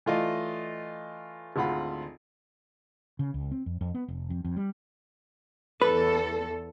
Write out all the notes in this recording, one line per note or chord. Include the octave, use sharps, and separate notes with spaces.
E3 A3 F4 D5 D#5
G#1 D2 F4 F#5 B5
C#3
C#2
C4
F2
F2
B3
F1
F2
F2
G3
E2 A4 B4